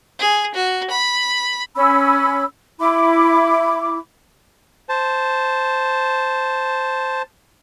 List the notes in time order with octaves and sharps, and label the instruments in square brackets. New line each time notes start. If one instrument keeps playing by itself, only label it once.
[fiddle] G#4
F#4
B5
[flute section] C#4 B5 E6
E4 B5 D6
[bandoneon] C5 A5